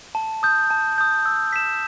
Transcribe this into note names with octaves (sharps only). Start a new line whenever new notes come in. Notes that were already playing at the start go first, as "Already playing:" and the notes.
A5
D#6 G6
A5
D#6 G6
E6
B6 E7